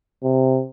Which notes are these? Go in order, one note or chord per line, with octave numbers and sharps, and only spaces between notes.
C3